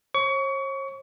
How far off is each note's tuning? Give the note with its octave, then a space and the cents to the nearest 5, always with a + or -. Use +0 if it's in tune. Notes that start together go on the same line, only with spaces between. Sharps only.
C#5 -45 C#6 +30